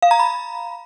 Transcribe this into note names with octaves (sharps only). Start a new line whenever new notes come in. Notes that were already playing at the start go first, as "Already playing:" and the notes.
F5
A#5
B5